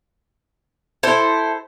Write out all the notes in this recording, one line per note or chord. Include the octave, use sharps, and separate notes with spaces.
E4 A4 C5